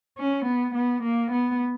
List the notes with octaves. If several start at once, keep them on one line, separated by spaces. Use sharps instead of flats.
C#4
B3
B3
A#3
B3